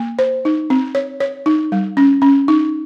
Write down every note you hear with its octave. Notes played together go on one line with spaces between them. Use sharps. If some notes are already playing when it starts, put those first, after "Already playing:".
Already playing: A#3
C5
D#4
C4
C#5
C#5
D#4
G3
C#4
C#4
D#4